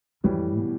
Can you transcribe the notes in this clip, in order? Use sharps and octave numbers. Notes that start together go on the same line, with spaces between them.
F2 A2 E3 G3
B2